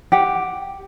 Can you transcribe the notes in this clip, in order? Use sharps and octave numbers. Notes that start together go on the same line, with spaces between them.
G4 F#5